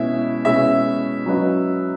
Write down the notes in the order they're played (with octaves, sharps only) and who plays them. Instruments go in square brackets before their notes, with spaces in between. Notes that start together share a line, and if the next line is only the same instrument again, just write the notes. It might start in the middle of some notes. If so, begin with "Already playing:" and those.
Already playing: [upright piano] B2 G#3 C#4 E4 G#4 [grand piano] E5
[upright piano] B2 G#3 C#4 E4 G#4 [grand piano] E5
[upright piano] F#3 C#4 F#4 B4 D#5